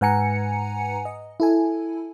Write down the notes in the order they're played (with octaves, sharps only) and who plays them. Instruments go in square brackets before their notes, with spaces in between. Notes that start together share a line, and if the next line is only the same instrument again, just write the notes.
[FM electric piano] G#2 B4 F#5 G#5 A#5 C#7
D#5
E4 A4 G#5